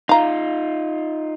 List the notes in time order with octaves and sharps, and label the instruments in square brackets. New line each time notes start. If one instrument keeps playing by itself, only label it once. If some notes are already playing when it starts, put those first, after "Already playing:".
[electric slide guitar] D#4 F4 [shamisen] F5 A#5